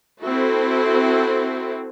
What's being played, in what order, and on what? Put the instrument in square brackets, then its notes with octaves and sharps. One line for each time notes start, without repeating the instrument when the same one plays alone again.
[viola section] C4 E4 F#4 A4